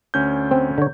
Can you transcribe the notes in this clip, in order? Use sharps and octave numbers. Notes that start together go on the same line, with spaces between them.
D2 C#4 G6
C4
D3 C#5